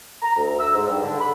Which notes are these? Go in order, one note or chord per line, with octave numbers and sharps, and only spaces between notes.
A#5
D2
E6
G#2
G2
D3
B5